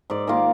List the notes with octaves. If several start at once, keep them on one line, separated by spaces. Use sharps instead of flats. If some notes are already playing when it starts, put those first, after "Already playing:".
G#2 D5
D#3 A#3 F4 A#4